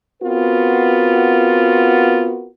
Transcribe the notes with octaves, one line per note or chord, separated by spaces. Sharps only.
B3 C4 F4 F#4 A#4